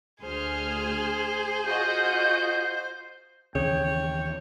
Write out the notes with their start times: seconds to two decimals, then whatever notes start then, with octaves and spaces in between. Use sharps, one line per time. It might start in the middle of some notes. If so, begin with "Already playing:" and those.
0.22 D2 G#4 C5 F6
1.65 F4 F#4 D#5 G6
3.55 D#2 C#3 E3 C#5 G5